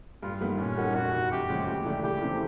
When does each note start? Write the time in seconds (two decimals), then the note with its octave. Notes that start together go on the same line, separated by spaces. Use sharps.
0.23 G2 F4
0.41 D#3 G3 B3
0.59 A#2 C#4
0.77 G3 A#3 D#4 F#4
0.95 F2 F#4
1.13 C3 D#3
1.32 F#2 G4
1.49 C#3 F3 G#3 C#4
1.67 D2 G4
1.85 C#3 E3 A3 D4
2.03 C#2 G4
2.21 C3 E3 A3 C4